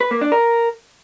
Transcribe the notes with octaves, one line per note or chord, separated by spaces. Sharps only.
B4
A#3
D4
A#4